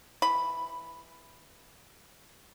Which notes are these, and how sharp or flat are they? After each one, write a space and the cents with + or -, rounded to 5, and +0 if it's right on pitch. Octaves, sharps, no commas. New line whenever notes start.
E3 +0 B5 +0